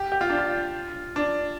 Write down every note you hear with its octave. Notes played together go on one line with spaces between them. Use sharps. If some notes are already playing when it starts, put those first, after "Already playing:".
Already playing: G4
G4
F4
D4
F4
D4